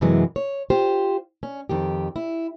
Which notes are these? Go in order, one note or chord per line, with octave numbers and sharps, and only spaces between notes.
F#2 C3 E3 F#3 G#3
C#5
F4 G4 C5
C#4
F2 D#3 G4
E4